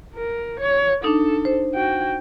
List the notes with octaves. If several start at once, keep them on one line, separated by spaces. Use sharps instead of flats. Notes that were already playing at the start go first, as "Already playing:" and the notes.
A#4
C#5
D4 D#4 A4
C5
F#4 G5